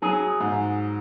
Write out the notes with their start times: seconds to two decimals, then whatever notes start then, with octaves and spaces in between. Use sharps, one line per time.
0.02 F#3 G#4
0.40 G#2